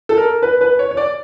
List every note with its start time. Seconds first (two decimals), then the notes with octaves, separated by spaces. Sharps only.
0.09 A4
0.17 A#4
0.42 B4
0.61 B4
0.79 C#5
0.91 C#5
0.97 D5